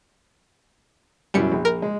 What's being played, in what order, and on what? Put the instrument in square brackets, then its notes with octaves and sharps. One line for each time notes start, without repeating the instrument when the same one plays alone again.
[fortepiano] F#2 B2 E4 [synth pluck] G3 C#7
[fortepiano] A#1
[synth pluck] A#4
[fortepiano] G#3